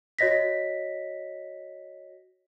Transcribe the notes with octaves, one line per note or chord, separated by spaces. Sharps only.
F#4 C#5 D#5 A#6 B6